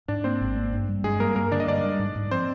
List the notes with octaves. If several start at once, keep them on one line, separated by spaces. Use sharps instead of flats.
G#2 D4 D5
A#3 C4 C5
G#1
A#3
G2
G3
G2 G#3 G#4
G3 A#3 A#4
G2 A#3 A#4
D3 D4 D5
D#5
G2 D4 D5
G3
G#2
G#2
F3 C4 C5